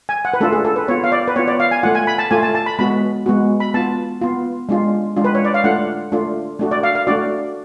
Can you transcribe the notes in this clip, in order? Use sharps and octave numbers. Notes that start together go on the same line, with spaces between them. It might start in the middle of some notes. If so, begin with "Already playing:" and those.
G#5
F#5
B4
A3 D4 F4 A4
G#4
A4
B4
B3 F4 C#5
F5
D5
B4
B3 F4 C#5
D5
F5
G#5
A3 F4 F#5
G#5
B5
A5
A3 F4 G#5
A5
A5
B5
G#3 B3 F#4 B5
G#3 B3 F#4
B5
B3 F4 A5
B3 F4
G#3 D4 F4
G#3 D4 F4
B4
C#5
D5
F5
A3 D4 F4 F#5
A3 D4 F4
A3 D4 F#4
D5
F5
F5
A3 D4 F#4 D5